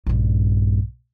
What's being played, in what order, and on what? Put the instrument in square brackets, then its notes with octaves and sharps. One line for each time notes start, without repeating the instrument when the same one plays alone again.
[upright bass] A#1 G2